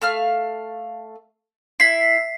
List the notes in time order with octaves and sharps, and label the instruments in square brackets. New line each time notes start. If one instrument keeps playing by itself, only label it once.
[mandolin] A3 F5 F6
[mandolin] E4 [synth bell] B6 C7